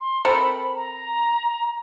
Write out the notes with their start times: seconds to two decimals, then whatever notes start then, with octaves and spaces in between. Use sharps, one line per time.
0.01 C6
0.25 C4 A4 A#4 B5
0.75 A#5